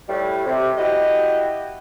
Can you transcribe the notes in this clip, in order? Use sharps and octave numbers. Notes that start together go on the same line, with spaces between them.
A2 G3
C3
E4 F#4 G4 D#5